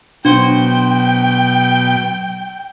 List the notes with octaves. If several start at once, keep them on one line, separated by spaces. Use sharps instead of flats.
B1 B2 D4 F#4 C5 G5